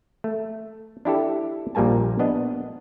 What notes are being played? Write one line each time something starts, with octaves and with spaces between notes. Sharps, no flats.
A3
D4 E4 G4 A4
A#1 A#2 G3 A#3 G#5 A5
B3 D4 D#5